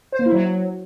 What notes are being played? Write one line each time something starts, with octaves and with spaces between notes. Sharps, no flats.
C5
A#3
E4
F#3